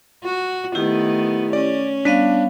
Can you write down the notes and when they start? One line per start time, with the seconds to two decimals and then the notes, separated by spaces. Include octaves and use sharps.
0.25 F#4
0.75 D#3 A3 B3 E4 G4
1.53 C#4 D5
2.05 G3 B3 D4 F5